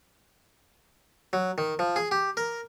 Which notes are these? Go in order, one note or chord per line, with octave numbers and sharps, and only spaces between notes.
F#3
D#3
F3
G#4
G4
A#4